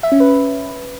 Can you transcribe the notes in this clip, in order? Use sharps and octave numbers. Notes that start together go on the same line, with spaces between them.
E5
C#4
B4